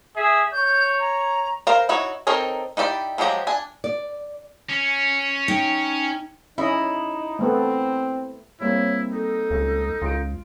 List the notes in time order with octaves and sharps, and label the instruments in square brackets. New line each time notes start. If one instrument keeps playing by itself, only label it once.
[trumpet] G#4 [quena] E5
[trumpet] C#5 [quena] G6
[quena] A#5
[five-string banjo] A#4 C5 F5 A#5
D#4 E4 F#4 C#5
C4 D#4 A4 A#4 C#5
D#4 E4 G4 D5
F3 F#3 G#3 G4 A#5
D4 G#5
[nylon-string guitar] D5
[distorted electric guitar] C#4
[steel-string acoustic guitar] D#4 G5
[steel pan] C#4 D#5 [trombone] D#4 [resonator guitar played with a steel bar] E4
[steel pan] A3 B3 A4 [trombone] C4
[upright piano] G3 A#3 C4 [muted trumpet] E4 [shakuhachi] C#5
[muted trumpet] D#4 [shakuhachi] A4
[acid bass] C#2
[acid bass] C#2 [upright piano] F4 D7